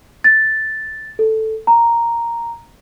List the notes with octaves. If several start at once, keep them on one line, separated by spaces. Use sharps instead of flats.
A6
A4
A#5